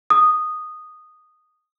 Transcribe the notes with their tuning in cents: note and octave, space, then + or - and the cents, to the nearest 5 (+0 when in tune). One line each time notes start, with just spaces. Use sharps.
D#6 -10